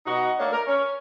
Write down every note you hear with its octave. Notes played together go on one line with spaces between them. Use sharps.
B2 D#4 F#4 D#5
A3 A#3 D4 C#5
A#4
C#4